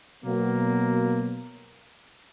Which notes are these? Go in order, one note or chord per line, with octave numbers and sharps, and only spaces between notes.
B2 F#3 A#3